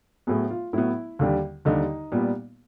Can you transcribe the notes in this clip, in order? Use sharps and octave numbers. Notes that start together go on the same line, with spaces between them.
A2 F#3 B3 G#4
F4
A2 F#3 B3 E4
D#2 D3 G3
D#2 D3 G3 D#4
A#2 G3 B3